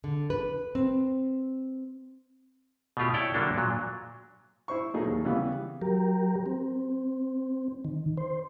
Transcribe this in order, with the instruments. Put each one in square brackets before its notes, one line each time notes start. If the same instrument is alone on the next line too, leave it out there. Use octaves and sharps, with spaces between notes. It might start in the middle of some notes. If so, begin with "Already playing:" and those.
[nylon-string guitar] D3
B4
C4
[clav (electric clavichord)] B2 A3 F4 G4
E4 C#5 D5 G5
D3 F#3 G3 A#3 D4 A4
A#2 F#3
[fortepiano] E4 C5 C#6
A#2 F#3 D#4 G#4 A4
D#2
C#3 E3 G3 B3
[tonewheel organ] F#3 G4 A#4
C4
D#3
C5